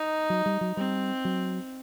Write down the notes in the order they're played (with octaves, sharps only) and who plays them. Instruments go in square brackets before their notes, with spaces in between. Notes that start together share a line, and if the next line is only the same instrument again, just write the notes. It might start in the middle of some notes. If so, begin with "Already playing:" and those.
Already playing: [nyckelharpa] D#4
[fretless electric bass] F#3
G3
F#3
[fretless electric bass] G3 [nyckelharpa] C4
[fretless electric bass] F#3